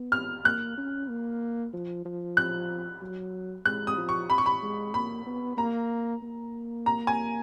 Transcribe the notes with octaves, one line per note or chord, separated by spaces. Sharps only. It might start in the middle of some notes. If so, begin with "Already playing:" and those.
Already playing: B3
F6
A#3 F#6
C#4
A#3
F3
F3
F#6
F#3
G#3 F#6
D#6
F3
C#6
B5
C#6
B5
G#3
A#3 B5
B3
A#3 A#5
A#3
A#5
G#5